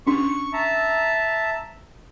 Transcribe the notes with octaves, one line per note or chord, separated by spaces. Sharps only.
C#4 D4 C#6
E5 A5 A#5